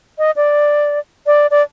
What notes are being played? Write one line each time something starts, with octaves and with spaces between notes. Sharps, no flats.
D#5
D5
D5
D5